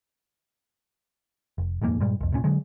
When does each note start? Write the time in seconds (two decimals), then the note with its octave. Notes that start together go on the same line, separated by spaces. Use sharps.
1.58 F1
1.82 D#1 F2 G#2 A#3
2.01 G2 A#2 G3 G#3
2.20 C2 F2
2.32 D#1 C2 A#2 C#4
2.44 D3 F#3 G#3